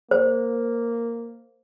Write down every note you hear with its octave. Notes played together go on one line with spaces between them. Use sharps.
A#3 C5